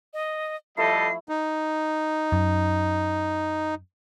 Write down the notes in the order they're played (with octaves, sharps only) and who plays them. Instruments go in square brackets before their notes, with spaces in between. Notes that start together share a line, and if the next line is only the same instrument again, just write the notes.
[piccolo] D#5
[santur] F3 A3 E4 [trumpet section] G3 A4 D#5 [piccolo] C7
[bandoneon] D#4
[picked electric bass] F#2